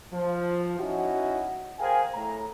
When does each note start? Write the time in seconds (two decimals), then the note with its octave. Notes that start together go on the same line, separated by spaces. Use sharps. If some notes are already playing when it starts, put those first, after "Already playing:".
0.13 F3
0.80 C#4 D#4 E4 F#4
1.80 G#4 A#4 C5 F5 G5 G#5
2.14 A2 A#5